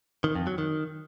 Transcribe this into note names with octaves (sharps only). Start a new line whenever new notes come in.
D#3
F2
F#3
D#3